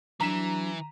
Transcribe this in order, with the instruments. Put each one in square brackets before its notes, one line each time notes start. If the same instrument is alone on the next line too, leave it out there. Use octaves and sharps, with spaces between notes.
[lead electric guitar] E3 [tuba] F#3 [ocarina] D4 [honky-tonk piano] A#5 B6 E7